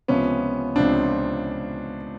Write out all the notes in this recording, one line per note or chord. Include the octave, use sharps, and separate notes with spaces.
C#2 C3 F3 B3 C#4
C#2 C3 F3 C4 D4